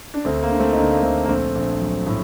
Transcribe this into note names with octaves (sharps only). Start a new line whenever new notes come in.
D4
D2 A3 C4
A#3
D3
A3 C4
D#4
D2 A#3 D4
A#3
D2 A3 C4
A#3
A#1 A3 C4
A#1
F#3
A2